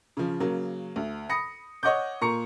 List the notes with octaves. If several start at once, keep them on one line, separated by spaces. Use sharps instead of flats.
C#3 F3
C#3 F#3 A#3
D2
B5 D#6 A#6 C#7
C#5 D#5 F#5 D6 G6
A#2 A#5 C#6 C#7